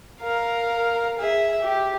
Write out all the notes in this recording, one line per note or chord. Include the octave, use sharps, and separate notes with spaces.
A#4 F5
G#4 E5
G4